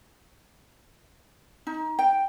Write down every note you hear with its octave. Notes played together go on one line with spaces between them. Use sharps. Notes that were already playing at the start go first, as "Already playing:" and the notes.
D#4
G5